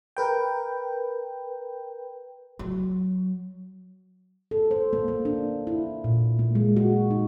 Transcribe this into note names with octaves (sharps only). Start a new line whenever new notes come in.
A#4 B4 G5
F#3
A4
C5
A#3
A#3
D4
E4
A#2
A#3
G#3
F#4
D#4